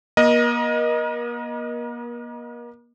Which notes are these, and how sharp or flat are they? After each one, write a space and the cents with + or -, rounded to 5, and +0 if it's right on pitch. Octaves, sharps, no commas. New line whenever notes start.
A#3 +45 A#4 +35 D#5 +0